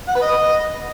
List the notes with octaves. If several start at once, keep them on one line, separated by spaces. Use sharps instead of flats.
F#5
B4
D#5